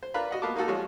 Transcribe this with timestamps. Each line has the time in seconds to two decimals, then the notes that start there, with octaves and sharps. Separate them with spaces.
0.03 C5
0.14 D4 F4 A#4 B4 F5 B5
0.31 F#4 D#5 F#5
0.42 A#3 B3 F4 A5 D6
0.56 A#3 D#4 F4 F#4 A4
0.68 F3 G3 G#3 C#4 F4 F#4